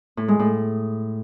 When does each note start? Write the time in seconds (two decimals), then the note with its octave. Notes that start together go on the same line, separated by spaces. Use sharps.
0.17 A2
0.28 G#3
0.39 A2